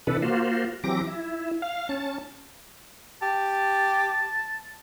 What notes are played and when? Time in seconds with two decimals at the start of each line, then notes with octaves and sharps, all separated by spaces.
0.07 C3 E3 D4 A4 B4
0.22 A#3 F4 F#4 C5
0.84 E3 F#3 C4 G4 D6 A#6
1.07 E4
1.62 F5
1.89 C#4 A5
3.22 G4 A5